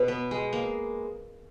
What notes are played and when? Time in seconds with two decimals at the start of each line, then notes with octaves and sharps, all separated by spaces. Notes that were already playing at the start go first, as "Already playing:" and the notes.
Already playing: B2 B4 C#5
0.08 B3
0.31 G#3
0.53 A#3